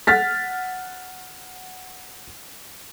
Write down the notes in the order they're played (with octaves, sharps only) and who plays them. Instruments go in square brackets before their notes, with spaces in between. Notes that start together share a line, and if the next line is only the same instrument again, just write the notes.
[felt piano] F#5 F6 A6 B6